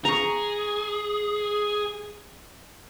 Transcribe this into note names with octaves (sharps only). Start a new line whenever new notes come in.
G#4 A#5 C#6